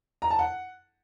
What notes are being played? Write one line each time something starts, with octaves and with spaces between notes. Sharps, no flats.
A#5
A5
F#5